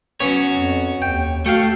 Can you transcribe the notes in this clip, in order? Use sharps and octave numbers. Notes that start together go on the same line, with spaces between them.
B3 C#4 F#4 C#5 C#6
F2
D#2 G5
A3 F#4 F5 G5 C#6